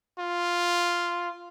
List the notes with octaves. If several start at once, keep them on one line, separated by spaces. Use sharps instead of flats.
F4